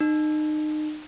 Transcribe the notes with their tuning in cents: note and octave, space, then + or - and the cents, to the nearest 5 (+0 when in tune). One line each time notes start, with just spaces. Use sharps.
D#4 -30